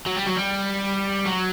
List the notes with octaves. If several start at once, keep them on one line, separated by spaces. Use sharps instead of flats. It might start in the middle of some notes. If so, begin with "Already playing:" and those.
F#3
G3
F#3
G3
F#3